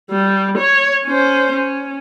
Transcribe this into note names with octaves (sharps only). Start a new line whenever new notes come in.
G3
C#5
C#4 C5
C#4